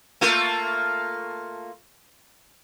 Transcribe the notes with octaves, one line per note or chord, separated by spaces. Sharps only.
A3 A#3 F4